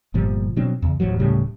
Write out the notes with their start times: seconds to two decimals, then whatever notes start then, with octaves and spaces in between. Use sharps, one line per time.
0.14 G1 A#2 F3 G3
0.56 B2 F#3 C4 D4
0.82 E2 C#3
1.00 D1 A1 F3 F#3
1.19 D1 A2 C#3 G3